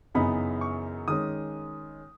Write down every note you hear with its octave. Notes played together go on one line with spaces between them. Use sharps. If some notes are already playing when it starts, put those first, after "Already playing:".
F#2 C#3 E3 B3 D#4 B5
C#6
D#3 G#3 C#4 D#6